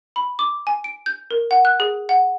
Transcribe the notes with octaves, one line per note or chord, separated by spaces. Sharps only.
B5
D6
G#5
D7
G6
A#4
F#5
F#6
G#4
F#5